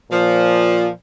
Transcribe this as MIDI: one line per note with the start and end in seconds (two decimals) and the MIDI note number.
0.11 0.90 46
0.11 0.88 53